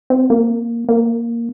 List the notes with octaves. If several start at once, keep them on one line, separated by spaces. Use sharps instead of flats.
C4
A#3
A#3